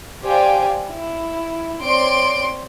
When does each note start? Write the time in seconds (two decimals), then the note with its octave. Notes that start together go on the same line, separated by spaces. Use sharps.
0.23 G4 C5 D5 F5 G5 G#5
0.90 E4
1.84 C4 C#5 D5 C6 D7